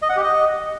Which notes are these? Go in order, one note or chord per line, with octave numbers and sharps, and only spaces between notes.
D#5
F#5
G4
D#5